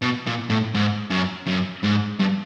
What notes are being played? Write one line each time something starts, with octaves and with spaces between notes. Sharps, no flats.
B2
A#2
A2
G#2
F#2
F#2
G#2
G2